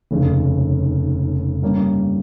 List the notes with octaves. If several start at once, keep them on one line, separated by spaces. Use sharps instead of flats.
F1 D#2 C#3 G#3 C#4
G2 G3 A#3 C#4